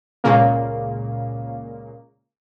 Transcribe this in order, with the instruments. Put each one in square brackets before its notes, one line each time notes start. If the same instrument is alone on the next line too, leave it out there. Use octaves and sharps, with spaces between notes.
[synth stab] C#2 A#2 C#3 A#3